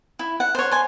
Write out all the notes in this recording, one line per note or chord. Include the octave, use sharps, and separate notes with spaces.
E4
F#5
C5 C#5
G#5 C6